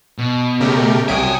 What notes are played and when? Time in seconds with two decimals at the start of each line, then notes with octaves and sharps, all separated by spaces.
0.18 B2
0.60 C#3 A3 G4 A#4
1.08 C2 F#3 E5 G5 G#5 D#6 D7